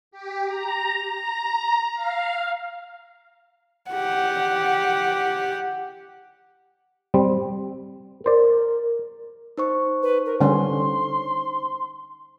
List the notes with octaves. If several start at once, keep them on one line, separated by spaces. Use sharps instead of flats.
G4
A#5
A#5
F5
G4 F#5
G3 C4
A#4 C5 D5
D#4 C5 C#6
B4
A#4
D3 G3 C#4 C6